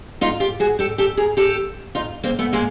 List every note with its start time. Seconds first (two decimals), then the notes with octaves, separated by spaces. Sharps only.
0.21 D#4 F4
0.40 F4 G4
0.60 F#4 G#4
0.79 G4 A4
0.98 G4 A4
1.17 G#4 A#4
1.37 G4 A4
1.95 D#4 F4
2.24 A#3 C4
2.39 A3 B3
2.53 G#3 A#3